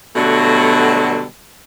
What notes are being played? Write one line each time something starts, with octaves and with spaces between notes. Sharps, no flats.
B2 D3 F#3 G3 A3 F#4